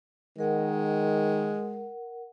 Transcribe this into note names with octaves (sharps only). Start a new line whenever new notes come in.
D#3 G#3 A#4 F#5